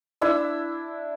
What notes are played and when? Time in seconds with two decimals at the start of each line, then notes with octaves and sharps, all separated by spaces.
0.21 D4 E4 E6